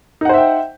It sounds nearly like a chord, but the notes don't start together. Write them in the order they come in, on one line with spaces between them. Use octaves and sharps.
D#4 F#5 C5 E5 G5